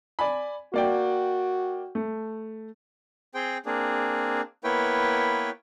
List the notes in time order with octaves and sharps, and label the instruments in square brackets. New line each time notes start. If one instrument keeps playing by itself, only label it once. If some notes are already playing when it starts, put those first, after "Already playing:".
[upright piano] D5 G#5 B5
[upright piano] A#3 D5 G5 [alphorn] F#4
[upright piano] A3
[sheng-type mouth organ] C4 G#4 C5 G5
A#3 C4 D4 G#4
A#3 B3 E4 B4 C#5 G5